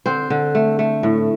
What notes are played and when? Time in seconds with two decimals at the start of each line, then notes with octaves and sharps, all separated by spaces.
0.06 D3 C4 C5
0.30 D3
0.55 A3
0.79 A3
1.03 A2